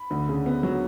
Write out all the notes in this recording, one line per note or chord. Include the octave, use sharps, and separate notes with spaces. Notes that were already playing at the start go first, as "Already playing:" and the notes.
Already playing: B5
D2
C#3
B3
F#3